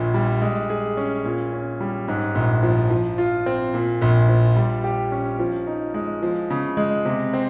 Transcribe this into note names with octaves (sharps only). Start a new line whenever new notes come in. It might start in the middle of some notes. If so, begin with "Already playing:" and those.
Already playing: A#1 A#2
G3
G#3
G#4
C#4
A#2
C#4
G3
G#2
A#1
F3
F3
F4
C4
A#2
A#1
F3
G3
G4
C#4
F3
D#4
G#3
F3
C#3
G#3
C3
C4